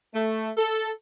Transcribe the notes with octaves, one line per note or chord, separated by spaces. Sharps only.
A3
A4